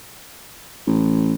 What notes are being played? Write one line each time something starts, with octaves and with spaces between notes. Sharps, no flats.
A1